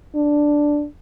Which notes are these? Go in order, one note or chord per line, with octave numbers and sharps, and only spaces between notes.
D4